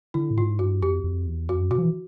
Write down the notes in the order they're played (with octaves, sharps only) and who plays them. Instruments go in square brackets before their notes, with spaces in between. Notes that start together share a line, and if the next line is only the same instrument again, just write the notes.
[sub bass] D3 [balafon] E4
[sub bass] A2
[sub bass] G#2 [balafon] F4
[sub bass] G2 [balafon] F#4
[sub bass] F2 [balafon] G4
[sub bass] F2
E2
[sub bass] F2 [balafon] F#4
[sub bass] F#2
[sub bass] B2 [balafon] F#4
[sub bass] F3
E3